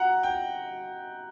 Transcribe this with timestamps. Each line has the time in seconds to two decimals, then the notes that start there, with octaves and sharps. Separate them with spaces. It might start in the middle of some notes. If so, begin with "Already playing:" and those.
Already playing: F#5 A#5
0.23 G5